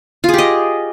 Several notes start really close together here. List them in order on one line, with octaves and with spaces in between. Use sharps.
F4 G#4 G4 D#5